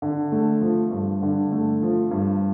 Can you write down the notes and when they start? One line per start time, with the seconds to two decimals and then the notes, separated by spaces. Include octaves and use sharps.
0.02 D3
0.32 A3
0.61 F3
0.91 G2
1.22 D3
1.52 A3
1.82 F3
2.11 G2